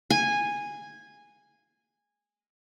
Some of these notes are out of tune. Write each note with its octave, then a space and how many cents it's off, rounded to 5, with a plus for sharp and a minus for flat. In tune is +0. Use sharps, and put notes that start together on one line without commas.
G#5 -10